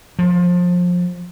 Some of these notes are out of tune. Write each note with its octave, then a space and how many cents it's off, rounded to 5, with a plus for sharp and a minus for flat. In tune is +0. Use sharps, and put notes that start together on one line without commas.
F3 +25